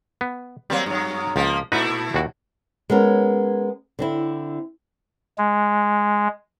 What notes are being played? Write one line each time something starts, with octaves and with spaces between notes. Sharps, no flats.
B3
F#3 G3 A#3 C4
G2 F#3
C#2 F3 A#3
A#2 A3 D#4 E4 F#4 B4
D#2 F#4
G#3 B3 C#4 A#4
D3 C4 E4
G#3